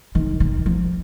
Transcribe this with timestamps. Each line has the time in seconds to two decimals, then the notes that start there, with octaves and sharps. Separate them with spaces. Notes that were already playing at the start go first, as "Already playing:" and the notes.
0.15 D#3
0.40 D#3
0.66 F3